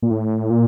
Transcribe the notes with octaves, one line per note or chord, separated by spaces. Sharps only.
A#2
A2
A#2